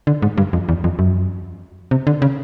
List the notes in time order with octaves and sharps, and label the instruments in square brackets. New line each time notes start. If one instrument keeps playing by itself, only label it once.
[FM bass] D3
G#2
G2
F2
E2
F2
F#2
C3
D3
C#3